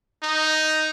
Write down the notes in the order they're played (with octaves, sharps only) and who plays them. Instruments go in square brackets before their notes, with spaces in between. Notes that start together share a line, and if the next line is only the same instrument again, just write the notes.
[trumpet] D#4